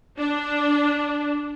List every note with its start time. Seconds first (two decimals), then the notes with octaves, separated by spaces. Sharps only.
0.18 D4